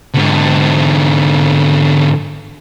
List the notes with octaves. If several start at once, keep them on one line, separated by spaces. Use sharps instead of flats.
G#2 D3